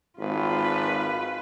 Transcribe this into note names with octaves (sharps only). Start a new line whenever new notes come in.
G#1 F4 B4